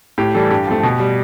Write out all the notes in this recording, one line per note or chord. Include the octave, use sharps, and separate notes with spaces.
A2 G4
E3 G3 A4
G2 G4
F3 A3
B2
G3